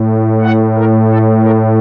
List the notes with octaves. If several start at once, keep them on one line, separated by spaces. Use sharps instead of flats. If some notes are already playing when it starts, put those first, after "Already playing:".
Already playing: A2
F#5
A#4
A4
A#4